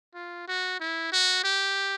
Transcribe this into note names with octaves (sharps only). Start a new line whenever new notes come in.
F4
F#4
E4
F#4
G4